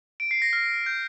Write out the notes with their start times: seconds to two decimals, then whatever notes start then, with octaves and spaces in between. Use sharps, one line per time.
0.20 D7
0.31 C7
0.42 A#6
0.53 F6
0.86 G6